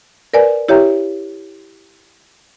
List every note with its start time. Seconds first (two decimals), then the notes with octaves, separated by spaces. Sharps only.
0.33 A#4 B4 D5 G#5
0.69 E4 G4 C#5 E5 G5 A#5